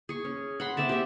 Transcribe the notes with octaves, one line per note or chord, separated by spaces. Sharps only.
G#4 C#6
C#4
F#5 B5 C6
C4 D5 E5 A5
G4 E5